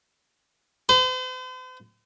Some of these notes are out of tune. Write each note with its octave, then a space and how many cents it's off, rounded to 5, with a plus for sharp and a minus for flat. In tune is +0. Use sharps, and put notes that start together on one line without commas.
C5 -45